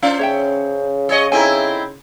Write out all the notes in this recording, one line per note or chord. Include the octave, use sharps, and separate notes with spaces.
C#4 D4 F4 C5 F5
C#3 C#5 E5 G5
G#4 C#5 D#5
C4 D#4 E4 A4 D#5 G#5